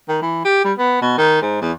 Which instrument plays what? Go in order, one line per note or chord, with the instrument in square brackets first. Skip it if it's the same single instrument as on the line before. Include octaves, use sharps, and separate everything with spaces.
[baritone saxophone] D#3
E3
G4
G3
B3
B2
D#3
G#2
E2